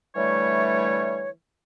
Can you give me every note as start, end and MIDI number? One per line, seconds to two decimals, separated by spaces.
0.15 1.29 50
0.15 1.29 52
0.15 1.29 55
0.15 1.29 57
0.15 1.29 73